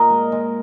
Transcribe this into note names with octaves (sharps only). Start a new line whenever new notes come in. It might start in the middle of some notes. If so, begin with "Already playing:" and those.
Already playing: A#2 A#4 D#5
G#3
G#3